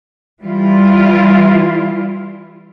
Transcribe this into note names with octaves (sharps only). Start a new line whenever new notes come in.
E3 G3 E4 F4